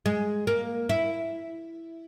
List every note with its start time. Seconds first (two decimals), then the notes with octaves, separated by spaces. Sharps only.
0.06 G#3
0.47 A#3
0.89 E4